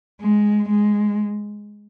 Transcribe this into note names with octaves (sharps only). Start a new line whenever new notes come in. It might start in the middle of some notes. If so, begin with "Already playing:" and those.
G#3
G#3